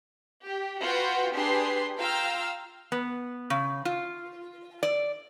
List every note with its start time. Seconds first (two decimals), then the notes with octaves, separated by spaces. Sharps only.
0.45 G4
0.81 F4 F#4 B4 F#5 G5
1.34 D4 G4 G#4 B4 C6 C7
1.98 F4 F5 G5 A#5 E6 F6
2.92 B3
3.50 C#3
3.85 F4
4.83 D5